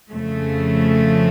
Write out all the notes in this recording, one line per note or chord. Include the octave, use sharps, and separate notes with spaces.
F2 C#3 F3 A3